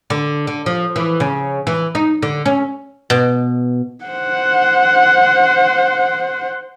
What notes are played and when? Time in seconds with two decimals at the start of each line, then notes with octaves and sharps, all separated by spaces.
0.10 D3
0.47 D3
0.66 F3
0.96 E3
1.20 C#3
1.67 E3
1.95 D#4
2.22 D3
2.46 C#4
3.10 B2
4.05 C5 F#5